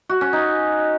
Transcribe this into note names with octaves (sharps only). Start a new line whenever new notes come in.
F#4
C#4
D#4